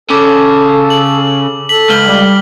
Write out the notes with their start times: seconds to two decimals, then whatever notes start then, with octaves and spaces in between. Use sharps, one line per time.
0.10 C#3 A4 D6
0.90 F#7
1.69 A4 B6 F#7
1.90 C#2 F6 G7
2.06 G3